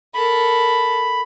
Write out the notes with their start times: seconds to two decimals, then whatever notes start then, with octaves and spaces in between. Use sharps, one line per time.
0.14 A4 A#4 B5